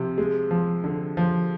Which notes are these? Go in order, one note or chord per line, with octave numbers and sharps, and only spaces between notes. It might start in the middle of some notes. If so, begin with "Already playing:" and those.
Already playing: C3 F3
G#3
F3
D3
F3